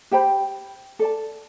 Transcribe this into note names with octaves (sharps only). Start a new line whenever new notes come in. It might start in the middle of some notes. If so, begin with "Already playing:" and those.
G4 C5 G5 B5
A4 D5 A5